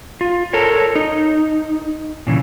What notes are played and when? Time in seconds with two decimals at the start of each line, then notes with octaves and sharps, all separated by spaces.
0.21 F4
0.53 A4 A#4 C#5
0.95 D#4
2.27 A#2 C#3 E3